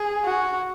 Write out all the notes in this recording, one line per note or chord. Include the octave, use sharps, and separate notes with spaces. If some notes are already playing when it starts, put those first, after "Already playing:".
Already playing: G#4
F#4